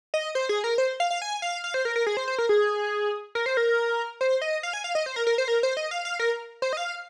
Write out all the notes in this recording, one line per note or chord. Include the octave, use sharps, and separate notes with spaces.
D#5
C5
G#4
A#4
C5
F5
F5
G#5
F5
F5
C5
A#4
A#4
G#4
C5
C5
A#4
G#4
A#4
C5
A#4
C5
D#5
F5
G#5
F5
D#5
C5
A#4
A#4
C5
A#4
C5
D#5
F5
F5
A#4
C5
D#5
F5